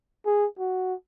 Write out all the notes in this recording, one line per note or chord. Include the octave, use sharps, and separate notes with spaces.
G#4
F#4